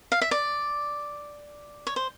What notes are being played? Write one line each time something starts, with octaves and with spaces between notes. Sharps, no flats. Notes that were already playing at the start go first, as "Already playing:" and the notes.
F5
E5
D5
C#5
C5